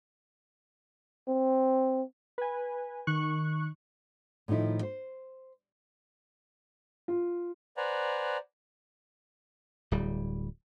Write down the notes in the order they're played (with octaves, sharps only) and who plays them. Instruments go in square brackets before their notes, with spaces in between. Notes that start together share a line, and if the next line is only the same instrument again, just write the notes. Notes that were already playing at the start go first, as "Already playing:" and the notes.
[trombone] C4
[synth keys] B4 G#5
D#3 C#6 F#6
[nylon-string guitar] A2 D#3 F3 D#4 E4
C5
[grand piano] F4
[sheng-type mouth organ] B4 C5 D5 F#5 G#5 A#5
[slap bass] D1 G3